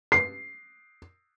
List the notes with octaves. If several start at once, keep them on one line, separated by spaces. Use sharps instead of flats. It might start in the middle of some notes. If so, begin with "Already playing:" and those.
C7